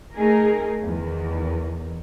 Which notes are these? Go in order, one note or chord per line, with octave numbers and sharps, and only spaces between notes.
A3 D#4 G#4 A#4
E2 D#3